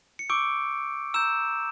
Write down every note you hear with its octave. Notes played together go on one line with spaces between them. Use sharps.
C#7
C#6 D6 E6 G6 D7
A#5 E6 G6 E7